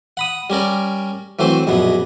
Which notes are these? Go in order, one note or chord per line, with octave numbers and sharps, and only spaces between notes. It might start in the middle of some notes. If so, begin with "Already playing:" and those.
F#5 B5 D#6
G3 C#4 A#4 D5
E3 F#3 A3 C4 C5
A#1 F#2 B2 B3